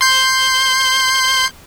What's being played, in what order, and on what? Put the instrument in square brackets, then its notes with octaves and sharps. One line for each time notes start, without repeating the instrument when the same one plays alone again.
[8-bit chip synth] C6 G6